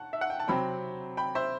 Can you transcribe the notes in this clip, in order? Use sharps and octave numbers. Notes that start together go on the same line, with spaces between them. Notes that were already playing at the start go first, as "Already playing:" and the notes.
Already playing: F#5 A5
E5
F#5
G5
A5
C3 F#3 C4 G5 B5
G5 B5
C5 E5